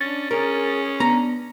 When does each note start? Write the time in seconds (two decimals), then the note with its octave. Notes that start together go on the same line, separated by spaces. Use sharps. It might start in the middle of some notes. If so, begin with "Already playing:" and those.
0.01 C#4 D4 A6
0.31 C#4 G#4 A#4
1.00 B3 D4 A#5